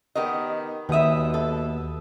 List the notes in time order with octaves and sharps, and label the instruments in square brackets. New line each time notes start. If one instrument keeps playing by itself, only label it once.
[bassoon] D#3 [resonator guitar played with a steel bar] B3 G4 D#5
[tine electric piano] D#2 D#6 [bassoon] B2 [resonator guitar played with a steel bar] B3 E5
[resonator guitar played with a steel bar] A4